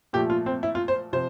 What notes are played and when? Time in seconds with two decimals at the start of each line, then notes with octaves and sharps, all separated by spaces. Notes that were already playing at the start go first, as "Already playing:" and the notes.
0.13 A#2 F3 A3 G4
0.30 F4
0.46 C4
0.63 E4
0.75 F4
0.88 C5
1.13 C3 F3 C5